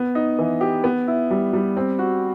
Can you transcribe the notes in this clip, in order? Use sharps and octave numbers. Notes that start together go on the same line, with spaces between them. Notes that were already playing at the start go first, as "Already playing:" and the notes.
Already playing: B3
D#4
E3
G4
B3
E4
G3
G3
C4
F#4